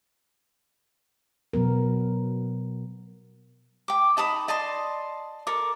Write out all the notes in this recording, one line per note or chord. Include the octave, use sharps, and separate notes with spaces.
B2 F#3 B3 A#4
G5 D6
D#4 A5 B5 D#6
D5 D#5 A5 C6
A4 A#4 D6